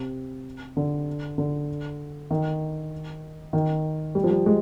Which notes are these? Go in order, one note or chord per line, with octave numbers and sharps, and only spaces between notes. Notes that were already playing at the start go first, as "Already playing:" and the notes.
Already playing: C3
D3
D3
D#3
D#3
G3
F3
G3
G#3